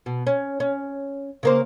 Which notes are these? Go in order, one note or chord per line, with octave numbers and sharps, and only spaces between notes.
B2
C#4
C#4
C#3 A#3 C5